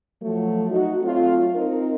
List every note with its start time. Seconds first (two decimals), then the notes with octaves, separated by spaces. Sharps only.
0.22 F3 F#3 A3
0.70 D#4 F#4
1.02 F#3 A3 C4 F4
1.55 C4 D#4 F4 A#4